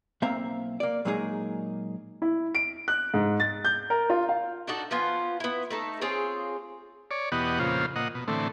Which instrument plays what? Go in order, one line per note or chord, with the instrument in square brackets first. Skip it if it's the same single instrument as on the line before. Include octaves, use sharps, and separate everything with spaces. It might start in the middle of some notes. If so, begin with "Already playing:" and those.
[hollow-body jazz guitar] B1 A#3 C4 E5 F5 A#5
A#3 D5
A#2 F#3 G#3 A#3 D#4 G#4
[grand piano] E4
D7
F#6
G#2
A6
G6
A#4
F4
F5
[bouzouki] D4 D#4 F#4 A4
F3 B3 C#4 F4
B3 E4
A3 D#4 A4
C4 F4 G#4 C#5
[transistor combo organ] C#5 D5
E2 B2 B3 G4 D#5 F#5
F2 A#2 C#3 F4 C5
A#2 D#5 F#5
B2
A2 D3 E3 A3 C4